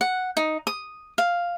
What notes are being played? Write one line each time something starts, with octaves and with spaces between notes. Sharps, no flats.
F#5
D#4
D#6
F5